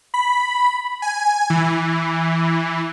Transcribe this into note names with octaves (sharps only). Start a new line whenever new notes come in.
B5
G#5
E3